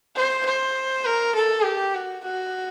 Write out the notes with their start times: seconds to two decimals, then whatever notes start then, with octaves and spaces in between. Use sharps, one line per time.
0.16 C5
0.45 C5
1.05 A#4
1.35 A4
1.64 G4
1.95 F#4
2.24 F#4